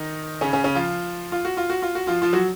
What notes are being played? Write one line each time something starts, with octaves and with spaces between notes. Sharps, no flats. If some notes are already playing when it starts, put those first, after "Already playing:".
Already playing: D#3 D#4
C#3 C#4
C#3 C#4
C#3 C#4
F3 F4
F4
F#4
F4
F#4
F4
F#4
F3 F4
F3 F4
F#3 F#4